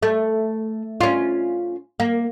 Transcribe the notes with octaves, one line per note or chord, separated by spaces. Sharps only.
A3
C#4 F4
A#3